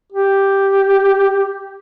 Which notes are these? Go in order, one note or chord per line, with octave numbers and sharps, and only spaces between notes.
G4